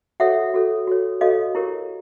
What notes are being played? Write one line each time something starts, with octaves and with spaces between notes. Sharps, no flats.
F#4 A4 C#5 E5 F#5
F#4 A4 C#5
F#4 A4 C#5
F#4 A4 C#5 D#5 F5
E4 G4 A#4 C#5